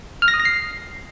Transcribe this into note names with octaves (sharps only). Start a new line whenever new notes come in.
F6
A#6
D#6
A#6
C7